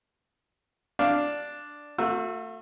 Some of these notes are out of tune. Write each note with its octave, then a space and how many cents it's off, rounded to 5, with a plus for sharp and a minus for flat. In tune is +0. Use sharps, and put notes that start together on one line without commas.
D4 +0 F5 +0
A3 +35 F#4 -35 E6 +0